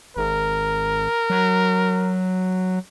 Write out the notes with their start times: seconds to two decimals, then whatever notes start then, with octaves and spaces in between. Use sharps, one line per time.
0.17 G#1 A#4
1.30 F#3